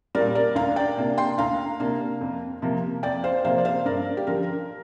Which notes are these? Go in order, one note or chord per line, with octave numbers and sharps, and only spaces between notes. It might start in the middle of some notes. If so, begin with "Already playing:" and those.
A#2 G3 A#4 D5
A#4 D5
D2 F5 A#5
D5 G5
C3 A#3 D4
G5 C6
D2 F5 A#5
C3 A#3 D4
F2
C3 F3 A#3
F2 D5 G5
C5 F5
C3 F3 A#3 C5 F5
D5
C5 F5
G2 A#4 D5
G4
D3 F3 A#4